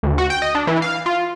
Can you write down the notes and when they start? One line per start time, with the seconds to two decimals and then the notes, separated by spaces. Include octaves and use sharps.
0.03 D2
0.18 F#4
0.30 G5
0.42 D#5
0.55 D4
0.67 E3
0.82 F5
1.06 F4